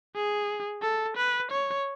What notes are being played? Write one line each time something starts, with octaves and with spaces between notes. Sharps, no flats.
G#4
A4
B4
C#5